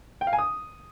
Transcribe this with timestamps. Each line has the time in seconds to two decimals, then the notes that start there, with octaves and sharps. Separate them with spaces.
0.21 G5
0.27 F5
0.33 G#5
0.39 D#6